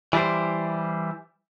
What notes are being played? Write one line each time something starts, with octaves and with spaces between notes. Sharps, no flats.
E3 G3 E4 G4 C5